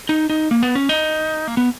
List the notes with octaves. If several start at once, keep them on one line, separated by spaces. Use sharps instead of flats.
D#4
D#4
A#3
B3
C#4
D#4
A#3
B3